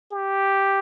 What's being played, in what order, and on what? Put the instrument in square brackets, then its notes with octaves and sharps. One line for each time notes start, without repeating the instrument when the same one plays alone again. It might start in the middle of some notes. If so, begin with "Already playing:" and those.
[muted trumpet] G4